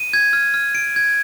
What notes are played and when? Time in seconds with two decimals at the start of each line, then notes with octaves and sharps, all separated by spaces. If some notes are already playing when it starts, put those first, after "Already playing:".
Already playing: D#7
0.13 G#6
0.33 F6
0.54 F6
0.75 D7
0.96 G#6